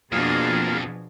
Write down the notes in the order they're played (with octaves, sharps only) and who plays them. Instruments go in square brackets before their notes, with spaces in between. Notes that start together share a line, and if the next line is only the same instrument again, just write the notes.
[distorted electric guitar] F2 [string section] B2 F3 [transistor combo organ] A#3 F4 [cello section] D4 F#4 G#4